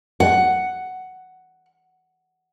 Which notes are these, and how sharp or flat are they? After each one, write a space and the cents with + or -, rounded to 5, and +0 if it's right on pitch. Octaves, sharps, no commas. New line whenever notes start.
F#5 +5